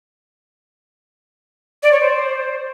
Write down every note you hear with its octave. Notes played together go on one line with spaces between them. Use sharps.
D5
C#5
C5